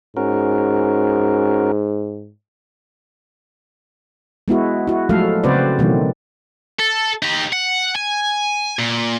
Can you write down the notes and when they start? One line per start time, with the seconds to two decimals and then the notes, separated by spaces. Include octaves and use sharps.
0.17 G#2 C#4 F#4 A#4
4.48 G#3 B3 E4 F#4
4.87 E4 F#4
5.09 F3 F#3 G#3 A3 A4 F5
5.44 C#3 C4 F#4 B4 C5 D5
5.79 B2 D#3 E3 F#3 A3 C4
6.79 A4
7.23 D#4 G4
7.53 F#5
7.96 G#5
8.79 A#2